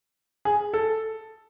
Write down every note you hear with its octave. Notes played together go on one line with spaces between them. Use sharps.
G#4
A4